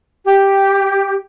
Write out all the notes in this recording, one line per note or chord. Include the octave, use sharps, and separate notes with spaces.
G4